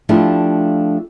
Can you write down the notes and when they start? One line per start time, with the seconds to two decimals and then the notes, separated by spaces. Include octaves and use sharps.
0.09 F3 A3 D4 E4 F4 G4